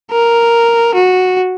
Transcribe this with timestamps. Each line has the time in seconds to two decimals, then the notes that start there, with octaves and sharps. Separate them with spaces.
0.11 A#4
0.94 F#4